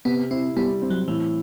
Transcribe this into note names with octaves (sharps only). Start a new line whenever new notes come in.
C3 B3
C4 E4
G3 B3
C4
F#3
A2 E3